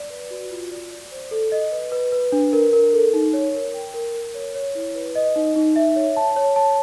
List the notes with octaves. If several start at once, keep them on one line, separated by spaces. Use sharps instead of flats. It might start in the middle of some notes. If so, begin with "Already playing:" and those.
Already playing: D5
B4
F#4
F4
D5
D5
C5
A4
D#5
B4
B4
B4
D4
A#4
A#4
A4
D#4
C#5
A#4
G5
A#4
A#4
C#5
C#5
E4
B4
D#5
D#4
D#4
E5
C#5
A5
C#5
A5